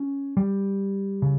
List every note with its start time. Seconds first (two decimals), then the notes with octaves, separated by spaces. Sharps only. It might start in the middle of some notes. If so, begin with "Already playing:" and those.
Already playing: C#4
0.37 G3
1.22 C#3